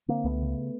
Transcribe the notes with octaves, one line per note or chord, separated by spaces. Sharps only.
D3 A#3 C4
C#2 A3 B3
C#3